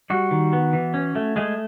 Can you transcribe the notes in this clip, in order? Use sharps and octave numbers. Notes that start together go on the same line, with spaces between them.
G3 F#4
D#3
B3
E3
C#4
A3
G#3 A3 G#4